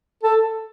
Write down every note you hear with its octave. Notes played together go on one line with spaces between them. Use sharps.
A4